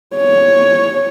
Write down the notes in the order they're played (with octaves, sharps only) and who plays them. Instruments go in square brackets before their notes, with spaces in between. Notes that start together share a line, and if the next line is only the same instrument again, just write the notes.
[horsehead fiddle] C#5